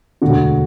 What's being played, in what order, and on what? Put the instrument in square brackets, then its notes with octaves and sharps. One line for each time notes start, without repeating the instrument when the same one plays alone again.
[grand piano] E1 D2 D3 F#4